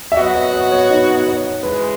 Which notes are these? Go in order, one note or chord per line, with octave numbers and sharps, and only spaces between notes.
E5
F#3 B3 F#4 D#5
D#5
D#5
C#5
D#4
C#5
C#3 E3 G#3 B4